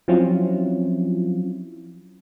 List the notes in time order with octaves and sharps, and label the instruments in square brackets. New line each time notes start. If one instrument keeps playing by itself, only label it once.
[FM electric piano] F3 F#3 C4 C#4 E4 F4